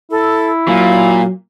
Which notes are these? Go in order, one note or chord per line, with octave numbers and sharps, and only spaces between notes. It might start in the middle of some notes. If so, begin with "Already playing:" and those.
E4 A4
A#2 F#3 F5